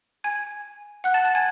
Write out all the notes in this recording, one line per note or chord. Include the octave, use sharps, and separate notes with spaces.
G#5 G#6
F#5 F#6
A5 A6
A5 A6
G#5 G#6